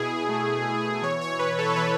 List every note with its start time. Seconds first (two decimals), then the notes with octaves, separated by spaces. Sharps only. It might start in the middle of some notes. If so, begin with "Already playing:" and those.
Already playing: B2 E4 G#4
0.29 A3
0.66 B2
1.03 E3 C#5
1.21 C#5
1.39 E3 B4
1.59 A4
1.69 A4
1.76 E3 B4